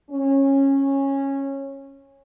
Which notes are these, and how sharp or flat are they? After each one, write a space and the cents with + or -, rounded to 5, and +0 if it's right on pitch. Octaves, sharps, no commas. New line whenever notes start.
C#4 -15